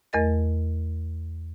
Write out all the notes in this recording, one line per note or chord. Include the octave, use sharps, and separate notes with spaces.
E2 A3 A#4 D#5 A6